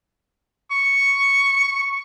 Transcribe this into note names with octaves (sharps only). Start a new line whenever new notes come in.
C#6